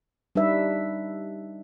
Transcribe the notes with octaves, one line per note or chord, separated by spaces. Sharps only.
G3 D4 D#4 B4 E5